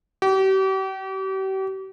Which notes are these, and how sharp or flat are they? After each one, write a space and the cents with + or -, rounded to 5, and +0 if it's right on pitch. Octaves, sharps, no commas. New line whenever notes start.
G4 -40